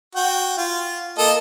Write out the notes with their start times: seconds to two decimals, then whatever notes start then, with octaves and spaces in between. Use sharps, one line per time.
0.15 F#4 G5
0.58 F4
1.18 A#3 A4 D#5